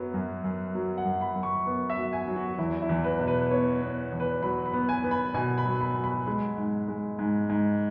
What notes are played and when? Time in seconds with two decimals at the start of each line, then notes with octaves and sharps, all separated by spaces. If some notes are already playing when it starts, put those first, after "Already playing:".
Already playing: F#2 F#3 B3
0.14 F#2
0.44 F#2
0.75 F#3
0.98 F#5
1.06 F#2
1.21 B5
1.36 F#2
1.43 C#6
1.66 B3
1.90 E5
1.97 F#3
2.13 G#5
2.28 F#3
2.36 F#4
2.58 E2 E4
2.82 E4
2.89 E2
3.04 B4
3.20 B2
3.28 B4
3.51 B3 C#5
3.81 B3
4.12 E2
4.20 B4
4.42 F#3 B5
4.66 B5
4.73 B3
4.89 G#5
5.04 B3
5.11 B5
5.34 B2 G#5
5.58 B5
5.65 F#3
5.81 B5
5.96 F#3
6.04 B5
6.27 G#3 B5
6.57 G#2
6.88 G#3
7.19 G#2
7.50 G#2